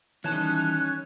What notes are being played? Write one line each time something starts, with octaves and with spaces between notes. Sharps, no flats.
D#3 E3 G3 C#4 A5 F#6